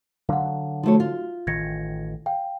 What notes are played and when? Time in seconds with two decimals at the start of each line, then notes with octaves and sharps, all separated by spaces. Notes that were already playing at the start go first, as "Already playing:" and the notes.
0.29 D3 F#3 D4 F5 F#5
0.83 F3 A3 D#4 F#4 C#5
1.00 F4
1.47 A1 D#3 G#6 A#6 C#7
2.26 F5 G5